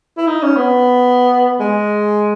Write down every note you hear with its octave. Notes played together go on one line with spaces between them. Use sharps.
E4
D#4
C#4
B3
G#3